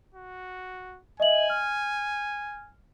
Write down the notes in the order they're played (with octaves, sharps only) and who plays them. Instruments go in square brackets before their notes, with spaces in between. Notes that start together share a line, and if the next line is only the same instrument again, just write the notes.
[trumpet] F#4
[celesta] D#5 E5 F#7 [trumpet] G#5
[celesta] F6